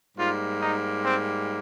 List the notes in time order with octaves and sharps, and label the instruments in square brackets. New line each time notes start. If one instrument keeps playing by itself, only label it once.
[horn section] G#2 G3 A#3 F4
D#4
C4